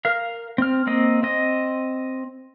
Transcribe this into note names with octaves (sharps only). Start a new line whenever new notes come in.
A#4 F5
C4 F6
A#3 C4 D#5
C4 D#5